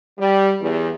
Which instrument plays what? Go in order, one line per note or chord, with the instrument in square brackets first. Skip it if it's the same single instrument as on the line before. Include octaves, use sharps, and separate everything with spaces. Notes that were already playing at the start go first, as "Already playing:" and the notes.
[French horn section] G3
E2